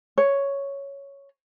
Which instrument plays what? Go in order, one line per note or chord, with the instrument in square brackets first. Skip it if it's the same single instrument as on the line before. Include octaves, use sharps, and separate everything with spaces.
[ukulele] C#5